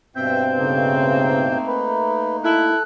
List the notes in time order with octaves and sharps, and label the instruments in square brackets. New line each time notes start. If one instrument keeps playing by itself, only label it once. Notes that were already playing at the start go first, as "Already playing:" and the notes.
[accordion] G2 B2 G6 [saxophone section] C4 [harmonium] E5 G5
[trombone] C#3 [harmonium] A3 A#3 D#4
[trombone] A#4 [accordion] B4
[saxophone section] E4 [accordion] A4 F#6